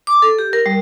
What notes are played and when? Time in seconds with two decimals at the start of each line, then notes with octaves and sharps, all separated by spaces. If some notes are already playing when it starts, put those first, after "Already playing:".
0.07 D6
0.22 A4
0.39 G4
0.53 A#4
0.66 G3